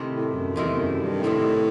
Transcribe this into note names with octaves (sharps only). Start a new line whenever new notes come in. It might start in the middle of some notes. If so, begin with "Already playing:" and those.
Already playing: C3 D#3 A3 E4
A2
F#2
E2 C3 D#3 A3 E4
F#2
G2
A2 C3 D#3 A3 E4